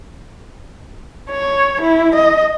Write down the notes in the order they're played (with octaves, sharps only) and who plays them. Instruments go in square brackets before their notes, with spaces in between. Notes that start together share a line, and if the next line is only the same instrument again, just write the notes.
[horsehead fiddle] C#5
E4
D#5